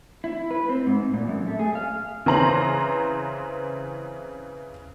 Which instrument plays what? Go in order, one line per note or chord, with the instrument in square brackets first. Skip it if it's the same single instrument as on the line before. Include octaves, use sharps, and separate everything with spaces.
[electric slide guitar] E4
B4
C4
G#2
A#2
F#2
A3
G#4
F5
[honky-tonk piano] C#3 E3 C4 A#5 C6 F#7